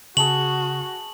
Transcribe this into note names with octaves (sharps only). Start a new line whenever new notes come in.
C#3 F#4 G#4 A5 C#6 F#7